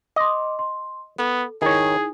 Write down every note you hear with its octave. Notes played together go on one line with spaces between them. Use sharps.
D#5 C6 D6
C6
B3 A4
D#3 D#4 E4 G#4 C#5